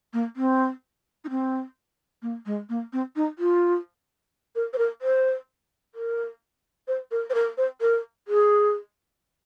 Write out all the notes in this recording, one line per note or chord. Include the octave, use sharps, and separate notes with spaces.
A#3
C4
D#4
C4
A#3
G#3
A#3
C4
D#4
F4
A#4
C5
A#4
C5
A#4
C5
A#4
C5
A#4
C5
A#4
G#4